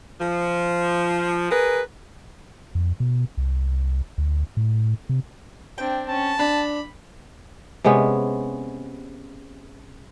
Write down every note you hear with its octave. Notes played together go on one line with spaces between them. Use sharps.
F3
G#4 A#4 B4
F2
B2
C2
D2
A2
C3
C4 D4 G5
C#4 A5
D4 B5
C3 G#3 B3 C#4